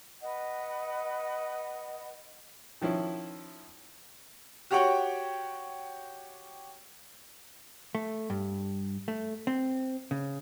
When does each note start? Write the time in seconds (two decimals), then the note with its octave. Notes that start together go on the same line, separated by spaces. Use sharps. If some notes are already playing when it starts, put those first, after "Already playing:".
0.21 B4 D#5 F#5
2.81 D#3 F3 C#4 E4
4.71 F#4 G4 C#5 F#5 G5 C#6
7.95 A3
8.30 G2
9.08 A3
9.47 C4
10.11 C#3